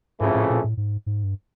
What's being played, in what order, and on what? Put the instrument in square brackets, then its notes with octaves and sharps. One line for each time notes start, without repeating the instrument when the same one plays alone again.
[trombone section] F2 C#3 E3 A3 [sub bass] G#2
[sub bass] A2
A#2
A2
G#2
G#2
G2